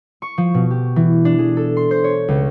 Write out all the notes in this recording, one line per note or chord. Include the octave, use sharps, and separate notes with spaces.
C#6
F3
B2
G4
E3
D4
G#4
A4
C6
C5
C#5
C#2